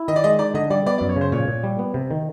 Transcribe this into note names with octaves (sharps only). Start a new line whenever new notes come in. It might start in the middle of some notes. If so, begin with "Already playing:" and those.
Already playing: E4
D#3 D#5
D5
G#3 D#5
D#4 D5
D3 D#5
G3 D5
B3 D5
D5
F#2
C#5
C#3 C5
A#2 C#5
A#2
G3
B3
C3
D#3